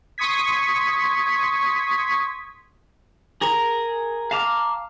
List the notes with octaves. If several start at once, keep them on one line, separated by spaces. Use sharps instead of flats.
C6 C#6 D#6 G#6 B6
G#4 A#4 A#5
F5 A5 A#5 D6 F6